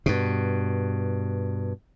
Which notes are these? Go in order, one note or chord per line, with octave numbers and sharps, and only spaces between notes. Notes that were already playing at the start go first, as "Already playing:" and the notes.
G2 B2